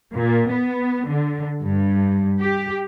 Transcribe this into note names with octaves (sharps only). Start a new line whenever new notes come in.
A#2
B3
D3
G2
G4